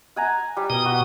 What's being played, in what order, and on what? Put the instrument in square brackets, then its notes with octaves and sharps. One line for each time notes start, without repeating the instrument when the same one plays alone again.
[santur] F#5 G#5 A#5
G3
[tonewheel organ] B2 D#6 [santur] A#4
[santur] F#4